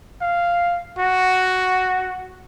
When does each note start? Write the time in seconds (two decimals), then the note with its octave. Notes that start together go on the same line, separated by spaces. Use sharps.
0.21 F5
0.99 F#4